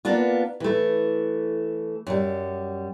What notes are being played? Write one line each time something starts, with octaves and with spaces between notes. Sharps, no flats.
A#3 B3 D4 F4
E3 A3
F#2 G3